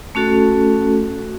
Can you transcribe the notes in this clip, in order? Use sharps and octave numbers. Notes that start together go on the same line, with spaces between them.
A3 C#4 F#4 A4